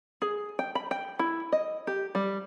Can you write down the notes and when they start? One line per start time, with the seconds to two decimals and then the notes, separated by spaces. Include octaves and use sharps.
0.22 G#4
0.59 G5
0.75 B5
0.91 G5
1.19 E4
1.52 D#5
1.87 G4
2.15 G3